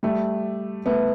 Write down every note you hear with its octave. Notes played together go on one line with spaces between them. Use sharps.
G3 A3
A3 B3